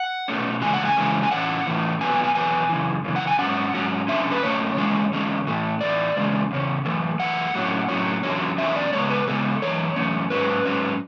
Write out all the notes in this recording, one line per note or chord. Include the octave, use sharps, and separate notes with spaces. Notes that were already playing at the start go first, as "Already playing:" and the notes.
Already playing: F#5
B2 A3 C#4
C#3 E3 G#3 C#4 G#5
F#5
G#5
C#3 E3 G#3 C#4
G#5
A2 E3 A3 C#4 F#5
A2 E3 A3 C#4
E2 B2 F#3 B3 G#5
G#5
G#5
E2 B2 F#3 B3 G#5
F#2 C#3 E3
F#2 C#3 E3
F#5
G#5
G#2 F#3 C#4 F#5
G#2 F#3 C#4
F#2 D3 A3 C#4 E5
B4
F#2 D3 A3 C#4 C#5
E2 D3 G#3 C#4
E2 D3 G#3 C#4
A2 E3 A3
A2 E3 A3 D5
E2 C#3 G#3 C#4
E2 C#3 C#4
F#2 E3 A3
F#2 E3 A3 F#5
A2 F#3 C#4
A2 F#3 C#4
E2 D3 F#3 C#4
E2 D3 F#3 C#4 E5
D5
C#3 G#3 B3 C#5
B4
C#3 G#3 B3 A4
F#2 E3 C#5
F#2 E3 A3 C#4
G#2 F#3 C#4 B4
G#2 F#3 C#4